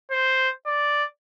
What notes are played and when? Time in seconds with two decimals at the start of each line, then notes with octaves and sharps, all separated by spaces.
0.11 C5
0.66 D5